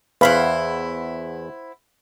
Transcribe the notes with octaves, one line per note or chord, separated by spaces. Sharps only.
E2 E4 B4 C5 F5 F#5 B5